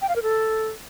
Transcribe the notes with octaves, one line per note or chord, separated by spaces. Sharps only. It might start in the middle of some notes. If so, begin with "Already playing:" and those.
G5
F5
A#4
A4